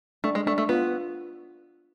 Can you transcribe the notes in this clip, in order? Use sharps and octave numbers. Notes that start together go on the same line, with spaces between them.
A3 D4
G#3
A3 D4
A3
B3 F4